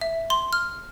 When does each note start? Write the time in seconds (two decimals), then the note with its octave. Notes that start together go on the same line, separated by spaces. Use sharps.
0.01 E5
0.30 C6
0.53 F6